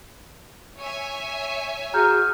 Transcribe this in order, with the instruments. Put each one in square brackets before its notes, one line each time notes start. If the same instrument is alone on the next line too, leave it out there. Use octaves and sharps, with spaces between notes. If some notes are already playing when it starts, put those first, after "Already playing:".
[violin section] C#5 E5 G#5
[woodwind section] F#4 G#4 [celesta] A#5 F6 G6